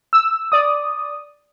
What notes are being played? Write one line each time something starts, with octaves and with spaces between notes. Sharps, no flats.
E6
D5 D#6